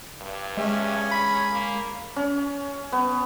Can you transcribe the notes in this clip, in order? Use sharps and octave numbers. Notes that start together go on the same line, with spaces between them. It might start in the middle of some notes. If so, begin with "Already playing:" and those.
G2
G#3 C#4 G#4 E5 G#5
B5
A#3
C#4
B3